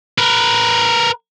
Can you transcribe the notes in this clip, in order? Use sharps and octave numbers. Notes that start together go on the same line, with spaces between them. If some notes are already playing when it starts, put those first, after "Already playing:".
A#4 B4